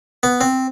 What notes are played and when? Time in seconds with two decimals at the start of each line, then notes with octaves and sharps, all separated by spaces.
0.23 B3
0.41 C4